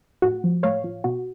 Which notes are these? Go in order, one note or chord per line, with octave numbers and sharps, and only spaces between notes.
A2 F#4
F3
A2 C#5 F5
F3
B2 F#4